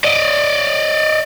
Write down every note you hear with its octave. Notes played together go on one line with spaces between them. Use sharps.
D5 D#5